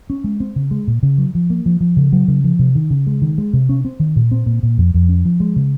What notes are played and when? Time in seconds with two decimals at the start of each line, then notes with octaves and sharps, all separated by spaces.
0.10 C#4
0.24 G#3
0.40 C4
0.56 C#3
0.71 G#3
0.87 A#2
1.03 C#3
1.18 F#3
1.35 F3
1.50 A#3
1.66 F3
1.80 F3
1.97 C#3
2.12 F#3
2.28 C#3
2.44 F3
2.59 C3
2.75 D#3
2.90 C#3
3.07 G#3
3.22 D#3
3.38 G#3
3.53 C3
3.69 C#4
3.85 C4
4.00 D#3
4.16 A#2
4.31 C4
4.46 A#2
4.63 A#2
4.78 F2
4.94 F2
5.09 C#4
5.25 F3
5.40 G#3
5.56 C#3